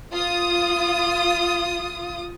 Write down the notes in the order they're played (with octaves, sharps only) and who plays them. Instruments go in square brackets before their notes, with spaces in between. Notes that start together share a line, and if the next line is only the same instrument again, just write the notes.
[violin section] F4 D#6